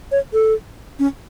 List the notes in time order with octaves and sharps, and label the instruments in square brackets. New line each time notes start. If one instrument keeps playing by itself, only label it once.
[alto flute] C#5
A4
C#4